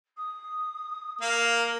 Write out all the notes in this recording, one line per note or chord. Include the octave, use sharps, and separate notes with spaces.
D#6
A#3 A#4 F5